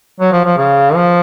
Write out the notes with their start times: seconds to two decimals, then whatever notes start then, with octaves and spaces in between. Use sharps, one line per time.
0.20 F#3
0.32 F3
0.45 F3
0.58 C#3
0.95 F3